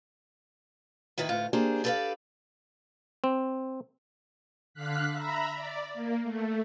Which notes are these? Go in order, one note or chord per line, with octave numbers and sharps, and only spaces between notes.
D#2 A2 D#3 E4 B4
D2 A2 F4
A#3 D4 G4 G#4 C5
G4 A4 B4 C5 D5 F5
C4
D3 F5 F#6 B6
E5 A#5 B5
D5
A#3
A3